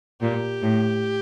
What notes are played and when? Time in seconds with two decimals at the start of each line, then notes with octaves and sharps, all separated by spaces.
0.21 A#2 G4
0.62 A2